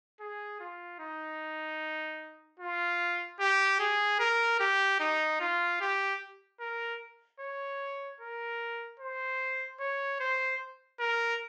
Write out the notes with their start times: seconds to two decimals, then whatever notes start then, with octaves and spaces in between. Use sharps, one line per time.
0.20 G#4
0.60 F4
1.00 D#4
2.59 F4
3.40 G4
3.80 G#4
4.19 A#4
4.60 G4
5.00 D#4
5.40 F4
5.80 G4
6.60 A#4
7.40 C#5
8.20 A#4
9.00 C5
9.80 C#5
10.20 C5
10.99 A#4